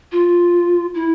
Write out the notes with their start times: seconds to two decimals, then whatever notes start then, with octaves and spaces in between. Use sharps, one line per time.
0.12 F4
0.94 E4